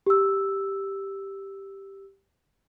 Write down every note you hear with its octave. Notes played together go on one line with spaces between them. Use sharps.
G4 E6